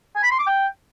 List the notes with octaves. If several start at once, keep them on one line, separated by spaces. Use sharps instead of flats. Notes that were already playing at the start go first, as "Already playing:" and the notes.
G#5
B5
C6
D6
G5